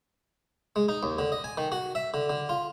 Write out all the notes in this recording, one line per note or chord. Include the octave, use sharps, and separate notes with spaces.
G#3
D#4
D#2
D3
D#5
G#5
D#3
F#4
E5
D3
D3
F4